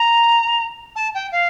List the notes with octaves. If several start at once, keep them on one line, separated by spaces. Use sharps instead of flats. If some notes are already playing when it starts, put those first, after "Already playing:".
Already playing: A#5
A5
G5
F5